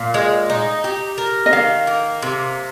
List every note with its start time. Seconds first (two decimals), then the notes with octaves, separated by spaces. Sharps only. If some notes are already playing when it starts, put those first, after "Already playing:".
Already playing: A#2 F5
0.14 G#3
0.50 D#4
0.84 G4
1.18 A#4
1.46 D#5
1.53 D#3 F5
1.87 A#3
2.22 C3